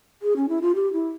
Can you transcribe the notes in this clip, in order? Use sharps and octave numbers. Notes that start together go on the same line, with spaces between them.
G#4
C#4
E4
F4
G4
E4